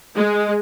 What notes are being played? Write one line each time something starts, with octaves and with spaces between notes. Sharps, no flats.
G#3